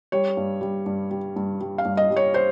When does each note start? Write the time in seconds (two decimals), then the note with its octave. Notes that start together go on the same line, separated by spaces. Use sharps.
0.12 G3 C#5
0.37 G2
0.61 G3
0.86 G2
1.11 G3
1.36 G2
1.61 G3
1.78 F5
1.85 G2
1.97 D#5
2.10 G3
2.16 C#5
2.34 C5